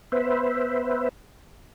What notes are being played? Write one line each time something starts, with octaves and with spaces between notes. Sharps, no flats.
B3 B4 C5 E5